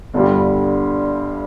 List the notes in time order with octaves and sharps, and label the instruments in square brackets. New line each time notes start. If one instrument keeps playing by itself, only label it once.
[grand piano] G1 G2 D3 G3